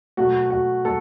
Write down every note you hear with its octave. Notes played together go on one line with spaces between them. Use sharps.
B2 F#3 A3 F#4
F#4
F#3 A3 A4